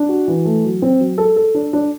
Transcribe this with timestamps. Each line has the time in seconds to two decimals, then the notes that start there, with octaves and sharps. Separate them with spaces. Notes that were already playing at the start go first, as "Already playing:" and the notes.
Already playing: D4
0.09 F#4
0.28 E3
0.45 A3
0.64 F#3
0.82 C4
1.00 F#3
1.18 A4
1.36 A4
1.54 D4
1.73 D4